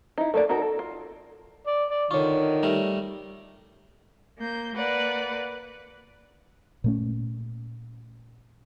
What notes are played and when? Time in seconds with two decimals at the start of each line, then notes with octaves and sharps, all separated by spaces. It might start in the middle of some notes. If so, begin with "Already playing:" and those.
0.18 D#4 E4
0.34 A3 A#3 D5
0.49 D#4 F4 F#4 A4 A#4
0.62 A4
0.79 F4
1.67 D5
1.90 D5
2.11 D3 D#3 F4 C#5 C#6
2.63 G3 A3 A#4
4.38 A#3 G6
4.75 A#3 B4 D5 F#5
6.84 A#2 A3 C#4